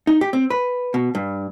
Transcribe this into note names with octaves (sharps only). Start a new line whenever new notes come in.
D#4
G4
C4
B4
B2
G2